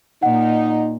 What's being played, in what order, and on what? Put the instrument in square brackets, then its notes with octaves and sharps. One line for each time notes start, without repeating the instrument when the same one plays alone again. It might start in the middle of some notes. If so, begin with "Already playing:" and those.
[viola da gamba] A#2 [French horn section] D#4 [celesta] F#5